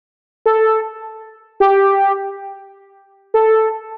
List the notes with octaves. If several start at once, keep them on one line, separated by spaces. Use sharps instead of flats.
A4
G4
A4